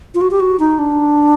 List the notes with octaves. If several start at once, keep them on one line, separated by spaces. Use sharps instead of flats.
F4
F#4
G4
F#4
D#4
D4